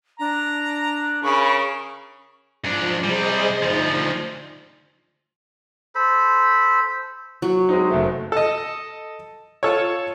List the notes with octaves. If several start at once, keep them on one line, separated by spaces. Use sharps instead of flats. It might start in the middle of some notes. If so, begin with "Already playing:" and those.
D4 A#5
C#3 A#4 B5 C#6
G#2 F3 D4
C3 G3 G#4 C5 D#5
D2 F3 D#4
A4 C5 B5
F#3
G#3 C4 D#4
F#1 A3
A4 D#5
F4 A4 C#5